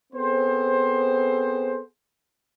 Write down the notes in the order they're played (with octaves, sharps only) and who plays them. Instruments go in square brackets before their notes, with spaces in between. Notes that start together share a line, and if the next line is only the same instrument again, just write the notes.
[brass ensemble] B3 C4 G#4 A4 C5